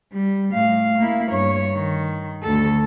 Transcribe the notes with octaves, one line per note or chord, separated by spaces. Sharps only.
G3
A2 F5
A#3 E4
G2 C#5
D#3
D2 A4